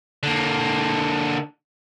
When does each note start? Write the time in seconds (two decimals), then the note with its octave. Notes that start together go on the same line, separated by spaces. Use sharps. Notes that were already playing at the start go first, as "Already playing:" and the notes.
0.23 D3 A#3